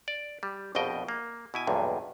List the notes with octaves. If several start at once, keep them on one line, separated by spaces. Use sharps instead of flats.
D5
G3
A#1 F2 B2 D#5 G5
A#3
B2 E4 G#5
B1 E2 G2 A#2